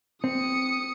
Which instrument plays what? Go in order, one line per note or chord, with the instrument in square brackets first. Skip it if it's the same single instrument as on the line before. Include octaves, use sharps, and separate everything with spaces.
[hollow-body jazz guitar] C4 [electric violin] D#6 C#7